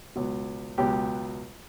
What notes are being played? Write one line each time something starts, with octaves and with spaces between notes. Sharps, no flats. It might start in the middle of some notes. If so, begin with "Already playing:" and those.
C#2 B2 F#3
C#2 B2 F#3 G4